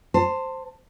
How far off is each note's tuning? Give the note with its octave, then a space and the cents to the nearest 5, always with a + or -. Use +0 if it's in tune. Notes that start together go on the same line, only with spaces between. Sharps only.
C5 +0 A5 +30